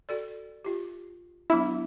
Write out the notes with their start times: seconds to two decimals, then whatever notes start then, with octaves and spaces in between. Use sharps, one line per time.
0.09 F#4 A4 D5
0.64 F4 G4
1.50 F#3 B3 D4 E4